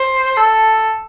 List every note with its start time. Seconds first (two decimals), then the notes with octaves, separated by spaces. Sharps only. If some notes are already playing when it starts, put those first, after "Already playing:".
Already playing: C5
0.37 A4